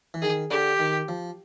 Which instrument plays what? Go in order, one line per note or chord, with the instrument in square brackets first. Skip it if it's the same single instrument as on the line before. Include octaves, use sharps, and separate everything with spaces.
[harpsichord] E3
[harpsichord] D#3 [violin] G#4
[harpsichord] D3 [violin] G4
[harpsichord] D#3
F3